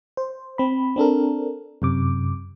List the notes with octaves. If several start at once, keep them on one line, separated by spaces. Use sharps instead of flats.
C5
C4 B5
C4 D4 A4 A#4
F#2 C3 D6